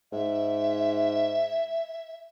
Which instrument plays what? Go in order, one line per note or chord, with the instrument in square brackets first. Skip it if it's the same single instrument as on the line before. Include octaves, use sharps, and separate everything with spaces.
[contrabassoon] G#2 [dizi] E5